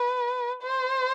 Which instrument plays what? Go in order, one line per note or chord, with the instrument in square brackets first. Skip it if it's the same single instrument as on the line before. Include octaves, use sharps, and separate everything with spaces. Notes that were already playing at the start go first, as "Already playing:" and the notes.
Already playing: [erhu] B4
C5